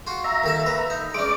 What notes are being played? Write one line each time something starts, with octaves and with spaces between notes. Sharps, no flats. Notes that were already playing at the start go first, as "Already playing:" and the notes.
F4 F#4
E5 A#5
D#2 A4 A5
B4
D#4
G#3 C#4 D5 D6